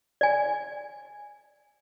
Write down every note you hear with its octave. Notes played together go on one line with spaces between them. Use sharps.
D5 G#5